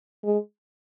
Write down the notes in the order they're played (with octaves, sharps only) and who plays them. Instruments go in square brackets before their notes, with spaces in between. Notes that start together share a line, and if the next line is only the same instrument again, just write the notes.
[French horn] G#3